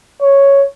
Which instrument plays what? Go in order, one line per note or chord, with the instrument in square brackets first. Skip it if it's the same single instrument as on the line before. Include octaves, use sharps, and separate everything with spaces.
[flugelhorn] C#5